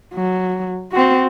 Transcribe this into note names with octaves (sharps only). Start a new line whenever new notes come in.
F#3
C4 F#4